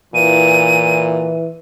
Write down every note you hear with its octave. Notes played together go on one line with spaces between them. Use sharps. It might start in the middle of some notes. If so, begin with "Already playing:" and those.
A#2 E3 D#7